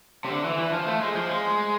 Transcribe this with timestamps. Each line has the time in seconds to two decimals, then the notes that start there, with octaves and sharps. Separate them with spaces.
0.25 C3
0.30 D3
0.44 E3
0.59 E3
0.73 F3
0.86 A3
1.01 G#3
1.15 F3
1.29 G#3